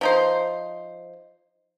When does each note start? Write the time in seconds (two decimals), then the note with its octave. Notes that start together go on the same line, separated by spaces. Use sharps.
0.01 F3 D#4 C5